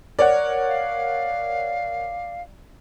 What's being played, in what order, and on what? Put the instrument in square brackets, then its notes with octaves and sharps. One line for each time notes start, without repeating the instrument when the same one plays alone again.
[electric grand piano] A#4 C#5 F#5 [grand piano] D5
[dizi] F5